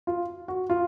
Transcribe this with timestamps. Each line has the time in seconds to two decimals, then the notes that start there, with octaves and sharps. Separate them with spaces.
0.07 F4
0.48 F#4
0.70 F4